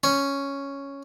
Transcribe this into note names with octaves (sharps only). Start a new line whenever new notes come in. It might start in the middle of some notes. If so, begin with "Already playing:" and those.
C#4